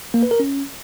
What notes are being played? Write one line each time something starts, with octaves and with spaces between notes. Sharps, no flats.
A#3
B4
A#4
C#4